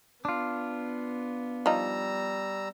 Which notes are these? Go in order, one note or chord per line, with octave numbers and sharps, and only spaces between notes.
B3 D4 F4
F3 G3 D#4 A#5 E6